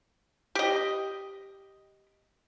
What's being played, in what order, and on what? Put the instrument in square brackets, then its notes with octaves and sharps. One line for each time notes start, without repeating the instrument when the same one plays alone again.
[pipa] G4 D#5